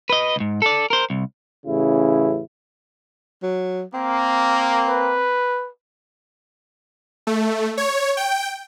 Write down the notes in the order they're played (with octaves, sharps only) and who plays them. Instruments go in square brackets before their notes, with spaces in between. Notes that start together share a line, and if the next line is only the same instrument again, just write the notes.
[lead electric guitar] B4 D#5
C#2 G#2
A4 D5
A#4 C5
C2
[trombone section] A1 C#3 E4
[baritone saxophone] F#3
[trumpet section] A#3 [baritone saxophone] C4
[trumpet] B4
[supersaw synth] A3
C#5
G5